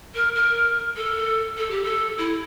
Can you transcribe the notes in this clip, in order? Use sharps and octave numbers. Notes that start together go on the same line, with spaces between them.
A#4
A#4
A4
A4
G4
A4
E4